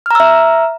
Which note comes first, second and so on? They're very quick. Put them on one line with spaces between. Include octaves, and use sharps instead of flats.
F6 A#5 E6 E5